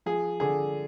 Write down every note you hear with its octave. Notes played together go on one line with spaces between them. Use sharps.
F3 G#4
D3 G#4